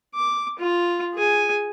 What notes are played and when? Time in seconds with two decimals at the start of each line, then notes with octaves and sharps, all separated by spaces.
0.15 D6
0.59 F4
1.14 G#4 G#5